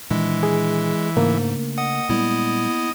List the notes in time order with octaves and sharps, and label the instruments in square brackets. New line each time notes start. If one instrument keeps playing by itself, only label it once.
[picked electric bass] A#2 D#3 D4 [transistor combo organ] E3 [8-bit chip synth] G#3
[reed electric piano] G#4
[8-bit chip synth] G#2 [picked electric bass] C#3 A3 D4 [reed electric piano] A#3
[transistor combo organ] D#5 [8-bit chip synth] F#5
[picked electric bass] A#2 G3 G#3 [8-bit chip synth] B3 E4